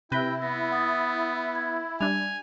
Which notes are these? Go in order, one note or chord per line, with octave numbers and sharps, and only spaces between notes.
C3 E4 G4 B4 G5 A#6 G7
B3 A#6
F#5 D#6 A6
G#6
G3 D4 G#5 F7